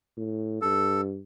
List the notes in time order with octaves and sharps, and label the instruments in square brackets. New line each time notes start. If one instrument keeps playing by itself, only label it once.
[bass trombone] A2
[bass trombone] G2 [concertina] A4